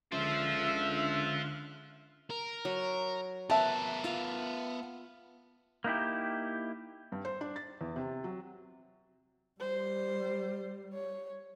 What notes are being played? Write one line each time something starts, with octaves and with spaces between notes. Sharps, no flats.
C#2 D3 F4 C5 E5 F6 F#6
A#4
F#3
B3 A#4 B4 E5 A5
F4 F5
A#3 D#4 E4 G4
G2
C5
D4
A6
E2
C3
F#3
G3 C5
C#5